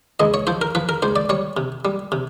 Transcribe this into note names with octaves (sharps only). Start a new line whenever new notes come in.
C#2 D#5
C#5
F3 C5
A#4
F3 B4
A#4
C#2 C5
D5
G3 C#5
C3
G3
C3